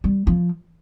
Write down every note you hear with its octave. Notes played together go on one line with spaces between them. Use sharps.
G3
F3